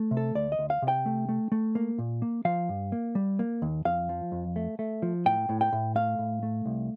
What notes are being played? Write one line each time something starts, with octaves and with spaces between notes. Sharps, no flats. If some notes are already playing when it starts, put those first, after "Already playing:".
Already playing: A3
C3
A4
D2 D5
D#5
D2
F5
C3
G5
A3
A3
A3
A#3
A#2
A#3
F3 F5
G2
A#3
G3
A#3
D#2
F2 F5
F3
F2
A3
A3
F3
A2 G5
A2
G5
A2
A3 F5
A2
A3
C2